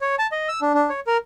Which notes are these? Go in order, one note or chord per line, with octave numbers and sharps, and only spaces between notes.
C#5
A5
D#5
E6
D4
D4
C#5
A#4